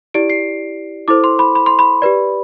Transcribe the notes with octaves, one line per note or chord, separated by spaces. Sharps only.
E4 G4 D5 D7
C7
E4 A4 C5 D6
C6
B5
B5
C6
B5
G4 B4 D5